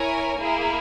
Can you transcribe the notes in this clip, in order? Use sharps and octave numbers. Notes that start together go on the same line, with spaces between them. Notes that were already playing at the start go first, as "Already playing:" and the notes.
Already playing: E4 A#4 C#5 G#5
A#3 E4 G#4